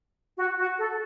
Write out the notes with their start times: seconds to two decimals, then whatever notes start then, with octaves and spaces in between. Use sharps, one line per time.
0.38 F#4
0.58 F#4
0.79 A4